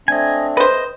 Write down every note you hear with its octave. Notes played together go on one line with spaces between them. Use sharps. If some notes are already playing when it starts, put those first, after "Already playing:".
A3 C4 D4 D#5 G#5
B4 C5 D#5